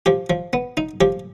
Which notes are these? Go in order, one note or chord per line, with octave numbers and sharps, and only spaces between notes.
F3 G4
F3
B3
D#4
F3 G4